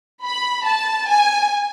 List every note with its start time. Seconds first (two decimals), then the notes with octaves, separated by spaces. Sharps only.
0.24 B5
0.65 A5
1.08 G#5